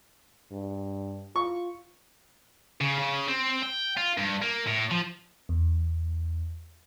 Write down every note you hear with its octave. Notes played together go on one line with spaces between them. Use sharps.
G2
F4 C#6
C#3
C#3
C4
G5
F4
G2
A#3
A2
F3
E2